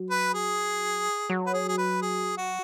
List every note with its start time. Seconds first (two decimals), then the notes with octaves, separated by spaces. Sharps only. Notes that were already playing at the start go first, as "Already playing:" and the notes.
Already playing: F#3
0.10 B4
0.34 G#4
1.30 F#3
1.46 B4
1.54 G#4
1.68 G#4
1.78 B4
2.02 G#4
2.38 F#4